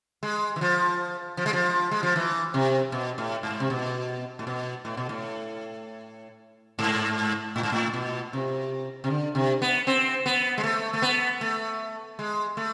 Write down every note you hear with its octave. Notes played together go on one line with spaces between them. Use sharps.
G#3
E3
F3
F3
G#3
F3
G#3
F3
E3
C3
B2
A2
G#2
C3
B2
A2
B2
A2
B2
A2
G#2
A2
G#2
A2
B2
C3
C3
D3
C3
B3
C4
B3
G#3
A3
A3
B3
A3
G#3
A3